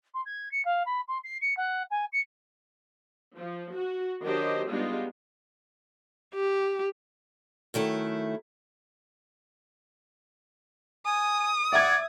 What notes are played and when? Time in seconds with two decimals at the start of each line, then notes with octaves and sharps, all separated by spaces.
0.14 C6
0.26 G#6
0.52 C#7
0.65 F5
0.86 B5
1.08 C6
1.24 C7
1.41 C#7
1.57 F#5
1.91 G#5
2.12 C#7
3.36 F3
3.75 F#4
4.23 D#3 F#3 D4 G4 C5 D#5
4.69 G3 G#3 B3 D4 D#4 F4
6.34 G4
7.74 F#2 D#3 A3 E4
11.05 G#5 D#6
11.73 D5 E5 F#5 G#6